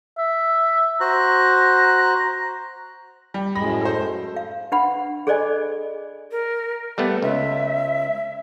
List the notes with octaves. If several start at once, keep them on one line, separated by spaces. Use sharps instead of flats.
E5
F#4 C5 A#5 F#6
G3
F#2 A2 G#3 B5 A#6
A4 C5
F5
D4 B4 F#5 B5
G#4 A4 C5 D5 D#5 G#5
A#4
G3 A3 B3 F#5
C#2 E5